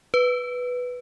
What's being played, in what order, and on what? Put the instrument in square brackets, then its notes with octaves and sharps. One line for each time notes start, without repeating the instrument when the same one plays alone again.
[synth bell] B4